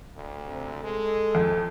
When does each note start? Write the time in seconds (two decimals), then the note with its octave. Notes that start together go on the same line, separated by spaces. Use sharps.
0.15 D2
0.46 C3
0.83 G#3 A4
1.35 F2